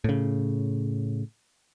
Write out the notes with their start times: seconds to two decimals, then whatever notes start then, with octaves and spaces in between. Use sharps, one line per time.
0.04 A2 C#3